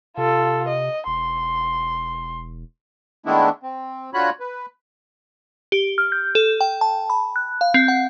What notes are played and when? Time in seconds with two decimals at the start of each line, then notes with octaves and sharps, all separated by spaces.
0.17 C3 F4 A4
0.68 D#5
1.07 E1 C6
3.26 D#3 G#3 A3 B3 D4 E4
3.63 C4
4.14 D3 F4 F#4 C#5 B5 F#6
4.40 B4
5.72 G4
5.98 F6
6.12 G6
6.35 A4
6.61 G5
6.81 A5
7.10 B5
7.36 F#6
7.61 F5
7.74 C4
7.88 F#5